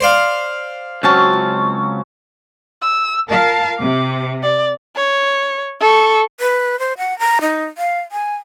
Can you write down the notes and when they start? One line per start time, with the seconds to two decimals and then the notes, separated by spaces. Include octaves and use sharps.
0.01 C5 D5 F5
1.03 C#2 F#3 C4 C#4 A5
2.82 E6
3.30 F4 A#4 F5 A5
3.80 C3 D6
4.43 D5
4.96 C#5
5.81 A4 C#6
6.39 B4
6.79 C5
6.98 F#5
7.19 A#5
7.41 D#4
7.78 F5
8.12 G#5